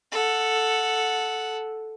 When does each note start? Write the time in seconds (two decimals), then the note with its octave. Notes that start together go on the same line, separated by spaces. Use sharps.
0.12 A4 F#5